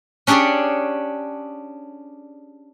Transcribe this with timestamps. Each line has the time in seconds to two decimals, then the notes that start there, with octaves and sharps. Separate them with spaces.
0.27 C#4 D4 G4 G#4 C#5 D5